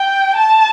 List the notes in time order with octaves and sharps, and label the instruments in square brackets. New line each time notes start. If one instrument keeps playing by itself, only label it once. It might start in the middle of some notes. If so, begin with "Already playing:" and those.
Already playing: [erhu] G5
A5